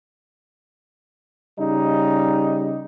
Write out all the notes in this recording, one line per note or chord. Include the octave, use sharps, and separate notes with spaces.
C#3 G3 D#4